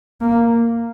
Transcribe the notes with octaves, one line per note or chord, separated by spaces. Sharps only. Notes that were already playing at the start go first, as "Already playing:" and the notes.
A#3